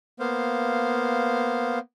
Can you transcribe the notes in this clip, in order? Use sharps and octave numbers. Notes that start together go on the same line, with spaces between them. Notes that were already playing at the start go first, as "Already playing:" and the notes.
A#3 B3 C5 F5